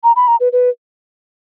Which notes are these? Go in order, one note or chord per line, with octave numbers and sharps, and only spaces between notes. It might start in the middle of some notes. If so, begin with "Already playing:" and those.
A#5
B5
A#5
B4
B4